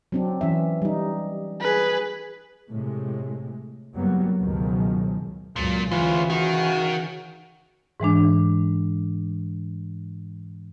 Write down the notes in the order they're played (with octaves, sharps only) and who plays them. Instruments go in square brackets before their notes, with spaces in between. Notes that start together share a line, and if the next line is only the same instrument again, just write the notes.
[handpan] F#3 C4 D4
E3 C#4 E5
G3 D#4
[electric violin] G#4 B4
[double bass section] A2 C3 G#3
F#1 F#2 F#3 G3 A#3 B3
C#2 F#2 B2 D#3 F3 G#3
[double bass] C#2 F#2 [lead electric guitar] A#2
[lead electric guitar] D2 [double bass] C#3 [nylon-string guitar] E3 [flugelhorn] F4
[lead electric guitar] D#3 [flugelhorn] F#4
[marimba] G#2 E3 G#3 D4